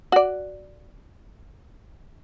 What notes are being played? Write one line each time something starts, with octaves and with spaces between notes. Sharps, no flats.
F#4 D5